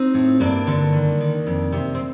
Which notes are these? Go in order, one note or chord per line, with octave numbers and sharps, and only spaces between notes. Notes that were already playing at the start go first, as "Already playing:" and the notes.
Already playing: C4 D#4
A2
G2 A#3 D4
D3
D#3
D#3
F2
C3
C4